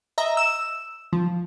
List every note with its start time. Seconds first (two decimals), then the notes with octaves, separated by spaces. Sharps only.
0.18 D#5 E5 A#5
0.37 E6 E7
1.13 F3